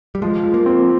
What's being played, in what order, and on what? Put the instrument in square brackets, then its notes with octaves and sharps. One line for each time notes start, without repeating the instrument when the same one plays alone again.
[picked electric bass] G3
[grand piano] F3 [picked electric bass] G#3
[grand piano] F3
[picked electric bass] A#3
[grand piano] C4